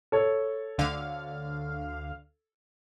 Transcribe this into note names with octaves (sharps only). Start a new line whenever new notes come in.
A4 C#5
D2 D3 F5